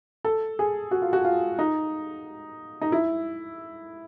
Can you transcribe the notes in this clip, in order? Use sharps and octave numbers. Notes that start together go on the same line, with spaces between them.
A4
G#4
F#4
F4
F#4
F4
D#4
D#4
E4